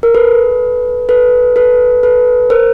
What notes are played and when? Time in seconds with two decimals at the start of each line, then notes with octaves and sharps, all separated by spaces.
0.03 A#4
0.15 A4 B4
1.09 A4 B4
1.56 A4 B4
2.03 A4 B4
2.50 A#4 C5